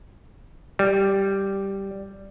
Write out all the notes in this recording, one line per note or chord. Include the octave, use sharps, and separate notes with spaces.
G3